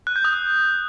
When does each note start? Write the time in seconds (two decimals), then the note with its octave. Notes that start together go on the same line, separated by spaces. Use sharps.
0.07 F#6
0.16 G6
0.25 D#6